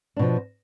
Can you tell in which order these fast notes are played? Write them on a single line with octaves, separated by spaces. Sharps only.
D4 B2 F3